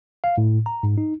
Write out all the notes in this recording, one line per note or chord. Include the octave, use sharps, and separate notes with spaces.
F5
A2
A#5
G#2
D#4